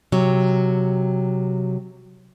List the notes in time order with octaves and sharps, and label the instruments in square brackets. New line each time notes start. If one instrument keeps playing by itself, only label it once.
[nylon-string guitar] C3 F#3